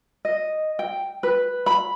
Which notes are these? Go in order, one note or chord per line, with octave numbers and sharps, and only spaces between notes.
D#5
G5
B4
B5